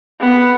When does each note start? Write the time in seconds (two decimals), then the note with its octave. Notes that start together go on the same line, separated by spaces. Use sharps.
0.20 B3